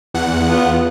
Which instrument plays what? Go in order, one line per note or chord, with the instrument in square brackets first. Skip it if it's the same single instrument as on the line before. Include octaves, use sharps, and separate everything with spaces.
[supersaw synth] E2 F#5
[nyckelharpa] B3 F4